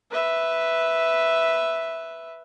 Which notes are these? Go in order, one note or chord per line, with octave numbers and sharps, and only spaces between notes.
B4 E5